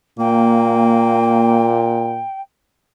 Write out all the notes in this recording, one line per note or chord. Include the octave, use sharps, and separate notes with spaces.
A#2 A#3 G5